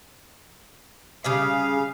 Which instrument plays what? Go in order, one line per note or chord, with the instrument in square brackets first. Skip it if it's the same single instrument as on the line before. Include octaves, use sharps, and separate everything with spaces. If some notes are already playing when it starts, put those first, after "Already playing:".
[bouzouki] C#3 G3 G#4 [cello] F5